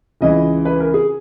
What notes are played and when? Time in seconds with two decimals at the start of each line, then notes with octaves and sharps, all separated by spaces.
0.21 C#2 C#3 E3 D#5
0.65 B4
0.80 A#4
0.94 G#4